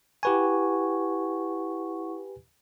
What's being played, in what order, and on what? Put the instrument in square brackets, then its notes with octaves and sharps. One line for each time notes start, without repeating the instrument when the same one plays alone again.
[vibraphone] E4 F#5 C#6 [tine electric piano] G4 B4 G#5